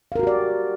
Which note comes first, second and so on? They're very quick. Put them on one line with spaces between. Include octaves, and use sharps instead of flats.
F5 A#4 F#4 G4 D5